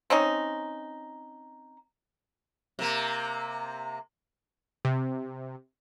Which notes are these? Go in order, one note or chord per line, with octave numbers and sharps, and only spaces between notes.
C4 C#4 D#4
C3 A#3
C3